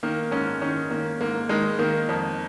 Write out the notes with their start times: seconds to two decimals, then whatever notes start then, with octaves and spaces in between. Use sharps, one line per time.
0.03 D#3 A#3
0.31 G#2 C#4
0.61 D#3 C#4
0.91 D#3 A#3
1.21 G#2 A#3
1.49 D#3 G#3
1.79 D#3 A#3
2.09 F2